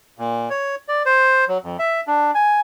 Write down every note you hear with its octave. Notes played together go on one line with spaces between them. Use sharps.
A#2
C#5
D5
C5
F#3
F2
E5
D4
G#5